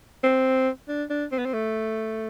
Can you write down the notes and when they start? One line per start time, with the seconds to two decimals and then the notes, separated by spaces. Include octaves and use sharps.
0.24 C4
0.89 D4
1.10 D4
1.32 C4
1.39 B3
1.46 C4
1.54 A3